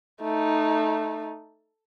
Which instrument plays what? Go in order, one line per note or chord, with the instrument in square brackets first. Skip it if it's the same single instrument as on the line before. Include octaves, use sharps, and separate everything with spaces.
[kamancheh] A3 D#4